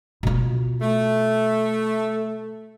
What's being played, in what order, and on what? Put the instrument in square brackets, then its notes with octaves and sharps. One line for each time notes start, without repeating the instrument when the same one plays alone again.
[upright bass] B2 F4
[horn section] A3